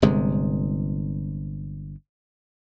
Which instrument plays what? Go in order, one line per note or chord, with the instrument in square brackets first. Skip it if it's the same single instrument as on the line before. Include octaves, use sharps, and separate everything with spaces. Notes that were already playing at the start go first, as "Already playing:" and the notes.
[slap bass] G1 C3 G#3